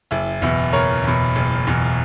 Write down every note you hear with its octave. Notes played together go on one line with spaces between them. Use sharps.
F#1 E4
E2 B2 E4
F#1 A#4 C#5
E2 B2
F#1
E2 B2